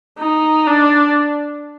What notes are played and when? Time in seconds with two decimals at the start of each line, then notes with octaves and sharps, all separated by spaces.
0.19 D#4
0.67 D4